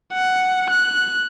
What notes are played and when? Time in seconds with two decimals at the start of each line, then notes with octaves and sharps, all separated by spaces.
0.13 F#5
0.70 F#6